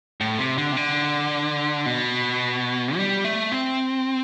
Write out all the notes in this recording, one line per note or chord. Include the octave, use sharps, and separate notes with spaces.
A2
C3
D3
C3
D3
B2
G3
A3
C4